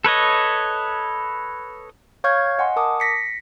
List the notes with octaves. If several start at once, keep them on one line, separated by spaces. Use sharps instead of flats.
A4 B4 C#5 D#5
C#5 F5 C#6 F6 G6 G#6
D#5 F#5 G#5 C6
A#4 A5 D6 D#6
A#6 B6 C#7